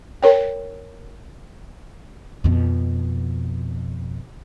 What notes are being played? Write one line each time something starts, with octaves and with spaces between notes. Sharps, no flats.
A#4 C#5 G5
F2 B2